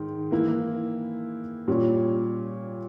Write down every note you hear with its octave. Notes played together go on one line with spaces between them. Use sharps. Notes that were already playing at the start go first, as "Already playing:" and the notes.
Already playing: G#2 D#3
E3 A#3 E4
A#2 G3 C#4